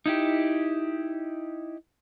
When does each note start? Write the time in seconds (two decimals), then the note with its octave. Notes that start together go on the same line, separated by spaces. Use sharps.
0.06 D#4 E4 G4